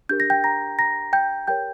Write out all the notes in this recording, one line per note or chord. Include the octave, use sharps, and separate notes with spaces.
D4 G4 A#4 G6
A#6
G5 G6
A#5 A#6
A#5 A#6
G5 G6
G4 A#4 C#5 G5 G6